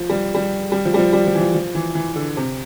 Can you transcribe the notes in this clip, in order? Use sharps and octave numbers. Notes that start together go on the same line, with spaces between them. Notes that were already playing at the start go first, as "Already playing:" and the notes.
Already playing: F3
G3
G3
G3
F3
G3
F3
G3
F3
E3
F3
F3
E3
E3
D3
C3